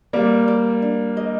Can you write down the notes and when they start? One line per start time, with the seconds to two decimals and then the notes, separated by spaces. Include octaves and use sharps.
0.13 G3 A#3 D5
0.48 D5
0.82 D4
1.17 D#5